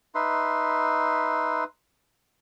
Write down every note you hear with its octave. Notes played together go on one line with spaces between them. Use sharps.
D#4 B4 E5 C6